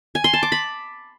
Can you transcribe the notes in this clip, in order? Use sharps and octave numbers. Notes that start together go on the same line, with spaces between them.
G#5
C6
A5
D6
B5